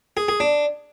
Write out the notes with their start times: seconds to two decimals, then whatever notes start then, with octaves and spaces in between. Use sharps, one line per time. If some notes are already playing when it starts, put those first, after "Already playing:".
0.17 G#4
0.28 G#4
0.40 D4